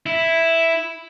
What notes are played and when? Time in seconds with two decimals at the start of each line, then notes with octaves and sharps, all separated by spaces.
0.06 E4